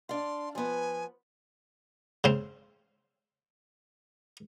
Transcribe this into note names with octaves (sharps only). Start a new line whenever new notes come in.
D4 F5 C6
F3 B3 G#5
C#3 C4